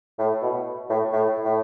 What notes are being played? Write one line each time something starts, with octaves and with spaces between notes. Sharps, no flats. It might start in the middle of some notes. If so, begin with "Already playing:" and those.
A2
B2
A2
A2
A2